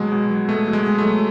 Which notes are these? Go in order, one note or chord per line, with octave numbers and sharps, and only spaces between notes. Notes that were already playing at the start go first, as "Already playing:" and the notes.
Already playing: B2 F#3 G#3
B2
F#3
B2 A3
F#3
G#3
B2
A3
F#3